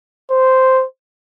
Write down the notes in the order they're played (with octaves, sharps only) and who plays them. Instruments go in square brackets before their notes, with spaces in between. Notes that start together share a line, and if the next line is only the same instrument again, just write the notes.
[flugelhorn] C5